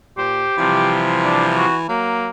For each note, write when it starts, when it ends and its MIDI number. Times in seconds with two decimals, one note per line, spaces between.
0.17 0.45 46
0.17 1.03 67
0.17 0.56 72
0.58 1.65 48
0.58 1.87 52
0.58 1.65 53
0.58 1.65 55
1.24 1.46 62
1.57 1.76 66
1.89 2.30 54
1.89 2.30 58